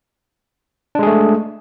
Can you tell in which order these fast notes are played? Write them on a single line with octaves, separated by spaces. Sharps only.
D4 G#3 G#4 A3